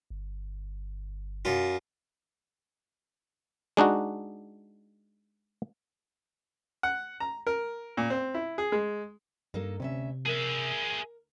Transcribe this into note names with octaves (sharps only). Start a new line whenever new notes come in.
G1
F#2 F4
G#3 D4 D#4 F#4
F#5
A#5
A#4
A#2
C4
E4
G#4
G#3
G2 A#3 D#4 A4
D2 C3 C#4 E5
G#4 A#4 E5